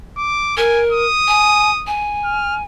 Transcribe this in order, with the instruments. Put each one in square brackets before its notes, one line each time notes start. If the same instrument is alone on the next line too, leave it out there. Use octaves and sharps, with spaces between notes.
[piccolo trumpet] D6
[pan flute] A#4 [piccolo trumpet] G#5
[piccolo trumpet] D#6
[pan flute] G#5
G#5
[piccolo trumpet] F6